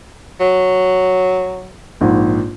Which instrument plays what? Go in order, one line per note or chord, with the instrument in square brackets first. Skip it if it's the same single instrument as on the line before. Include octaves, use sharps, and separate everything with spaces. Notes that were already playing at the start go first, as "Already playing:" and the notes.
[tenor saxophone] F#3
[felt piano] A#1 G#2